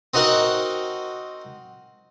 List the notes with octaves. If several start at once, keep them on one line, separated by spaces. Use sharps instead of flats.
C4 D#4 F#4 A#4 F#5